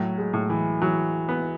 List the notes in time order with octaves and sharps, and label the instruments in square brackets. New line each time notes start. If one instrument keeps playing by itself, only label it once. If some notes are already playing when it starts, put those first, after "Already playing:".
Already playing: [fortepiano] A2 [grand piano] F#3
[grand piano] G#3
[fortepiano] A2
[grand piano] E3
[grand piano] E3 [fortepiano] F#3
[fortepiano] B3